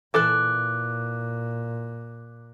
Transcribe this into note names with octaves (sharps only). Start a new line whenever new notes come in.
A#2 E3 A4 D6 F#6